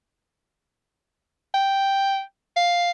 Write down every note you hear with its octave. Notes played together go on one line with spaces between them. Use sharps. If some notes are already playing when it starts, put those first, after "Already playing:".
G5
F5